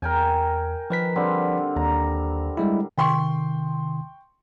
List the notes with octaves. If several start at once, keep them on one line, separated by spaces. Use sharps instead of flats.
E2 A#4 G5 G#5
D#3 F3 B4 B6
D3 G3 C4
D#2 A#5
G3 G#3 E4
C3 D#3 G5 C6 C#6